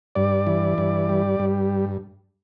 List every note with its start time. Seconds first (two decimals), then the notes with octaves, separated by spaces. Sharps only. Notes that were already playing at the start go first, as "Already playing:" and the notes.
0.15 G2 D5
0.47 E3
0.78 G2
1.09 G3
1.40 G2